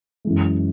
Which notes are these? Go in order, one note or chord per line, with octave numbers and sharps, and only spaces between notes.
F#2 E3 G#3